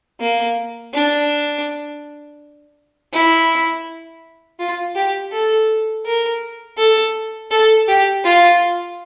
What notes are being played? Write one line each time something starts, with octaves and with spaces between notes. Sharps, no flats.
A#3
D4
E4
F4
G4
A4
A#4
A4
A4
G4
F4